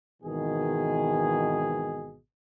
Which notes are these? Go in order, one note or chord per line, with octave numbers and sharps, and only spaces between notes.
G#1 B2 D#3 E3 G#4